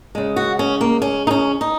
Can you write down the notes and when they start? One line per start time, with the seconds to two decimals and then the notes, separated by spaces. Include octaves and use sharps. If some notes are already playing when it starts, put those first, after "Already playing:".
0.15 C#3 G#3
0.36 F#4
0.59 C#4
0.81 A#3
1.02 C#4
1.27 D#4
1.31 C#4
1.61 D#4